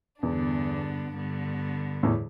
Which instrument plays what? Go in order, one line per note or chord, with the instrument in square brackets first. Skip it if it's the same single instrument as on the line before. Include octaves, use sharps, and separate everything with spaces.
[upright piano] E2 [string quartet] G2 D3 B3 D4
[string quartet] G2 D3 B3
[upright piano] E2 A2